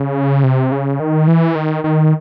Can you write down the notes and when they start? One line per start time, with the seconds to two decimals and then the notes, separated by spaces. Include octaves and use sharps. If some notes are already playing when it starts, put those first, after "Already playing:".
Already playing: C#3
0.44 C3
0.72 C#3
1.00 D#3
1.27 E3
1.55 D#3
1.84 D#3